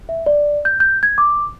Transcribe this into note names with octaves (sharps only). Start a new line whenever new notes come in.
E5
D5
G6
G6
G#6
D6